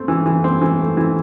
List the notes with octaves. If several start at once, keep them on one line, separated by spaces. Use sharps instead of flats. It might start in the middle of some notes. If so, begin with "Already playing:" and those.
Already playing: A3 C4
E3
E3
C4
E3
A3
E3